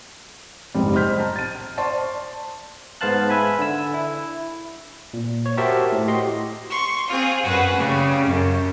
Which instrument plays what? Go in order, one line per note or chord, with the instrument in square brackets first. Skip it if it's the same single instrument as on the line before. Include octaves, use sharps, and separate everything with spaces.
[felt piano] F#1 G#2 G3
C5 D#5 C6 F6 G6 B6
A5 A#5
A6 D#7
F6
C5 D5 A5 C6 C#6
[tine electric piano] G#2 B3 C5 F5 A5 F#6
B4 E5 G#5 B5
D3 E6
E4
A#2
C#5
F#4 G4 A#4 C5 E5 A5
A2
F#4 G4 D#5 C6
[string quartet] C6 C#6
C4 F4 G#4
F#2 F#4 G#4 B4
C#3 G3
F#2